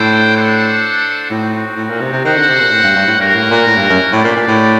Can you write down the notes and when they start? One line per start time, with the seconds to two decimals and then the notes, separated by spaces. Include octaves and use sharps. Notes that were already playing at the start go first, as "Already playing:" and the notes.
Already playing: A2 D4 A4 C5 G5
0.37 D4 A4 C5 F#5
1.30 A2 C4 D#4 F#4
1.78 A2
1.89 A#2
2.00 C3
2.12 C3
2.25 D#3 F#4 C5 F#5
2.36 D3
2.48 C3
2.60 A#2
2.71 A2
2.83 G2
2.96 G2
3.07 A2
3.19 G2 A#3 F#4 A#4 F#5
3.34 A2
3.50 A#2
3.66 A2
3.77 G2
3.90 F#2
4.12 A2 D4 G4 D5
4.24 A#2
4.36 A#2
4.48 A2